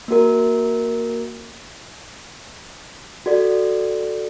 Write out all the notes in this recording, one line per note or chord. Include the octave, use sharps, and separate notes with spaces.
A#3 F#4 A#4
F#4 A4 D5